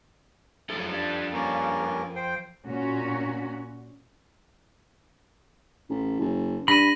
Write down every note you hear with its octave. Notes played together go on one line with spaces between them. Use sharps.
F#2 F3 A3 A4
G3 D4
G2 A#3 C#4 A#4
C5 G5
A#2 C#4 F#4
A1
F#1
G2 B5 A#6 D#7